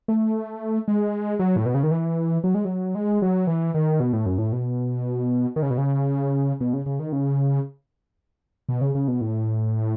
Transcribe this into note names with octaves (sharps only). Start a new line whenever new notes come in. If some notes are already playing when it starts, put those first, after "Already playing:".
A3
G#3
F#3
A2
B2
C#3
D#3
E3
F#3
G#3
F#3
G#3
F#3
E3
D#3
B2
A2
F#2
A2
B2
D#3
C#3
B2
C#3
B2
C#3
C#3
D#3
C#3
B2
C#3
C#3
B2
A2